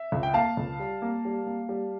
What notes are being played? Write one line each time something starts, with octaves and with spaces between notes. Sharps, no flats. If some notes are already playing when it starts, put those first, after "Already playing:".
Already playing: E5
C#2
G5
A#3 F5 A5
C#2
G3
A#3
G3
A#3
G3